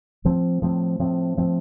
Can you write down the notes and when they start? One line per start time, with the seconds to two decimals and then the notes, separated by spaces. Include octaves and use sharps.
0.25 A2 F3 C4
0.62 A2 F3 C4
0.99 A2 F3 C4
1.37 A2 F3 C4